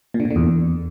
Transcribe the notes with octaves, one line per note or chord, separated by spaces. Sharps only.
A#2
D3
A#2
D3
E2